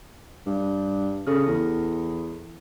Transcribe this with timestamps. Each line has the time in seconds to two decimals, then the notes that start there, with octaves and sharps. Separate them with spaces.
0.47 G2
1.27 C#3 G4 A4 F6
1.47 E2 A4